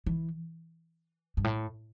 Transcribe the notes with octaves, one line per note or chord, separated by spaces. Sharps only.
E3
G2
A2